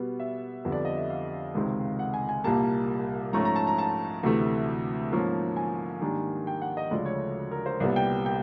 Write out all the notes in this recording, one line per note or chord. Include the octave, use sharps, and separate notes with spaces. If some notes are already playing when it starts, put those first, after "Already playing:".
Already playing: B2 G3 B3
E5
F2 D3 G3 B3
D5
D#5
E5
F5
C#2 C3 D#3 G#3 C4
F#5
G#5
G#5
C2 A#2 G3 A#3 A5
G#2 F3 A3 C#4 A#5
A#5
A5
A#5
A5
D2 C3 E3 A3
G#2 F3 A#3 C#4
G#5
G#2 D#3 G3 A#3 D4
G5
F#5
D#5
D2 C#3 F3 G#3 D5
C#5
A#4
C5
C2 A#2 G3 B3 D5
G5
G5